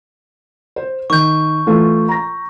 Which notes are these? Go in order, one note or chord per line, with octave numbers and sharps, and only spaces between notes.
C5
D#3 C#6 G6
E3 A3 F4
A#5 A#6